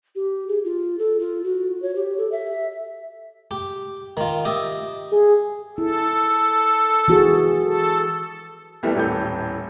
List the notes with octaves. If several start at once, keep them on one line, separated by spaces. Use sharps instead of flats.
G4
G#4
F4
A4
F4
F#4
C#5
G4
A4
E5
G4
D#3 F4
G4 D#5 E5
G#4
E4 A4
E3 F#4 G#4
A4
C2 E3 G3 A3 B3
D#1 A2 E3 A4 G6